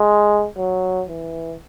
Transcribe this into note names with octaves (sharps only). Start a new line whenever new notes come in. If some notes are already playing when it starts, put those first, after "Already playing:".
Already playing: G#3
F#3
E3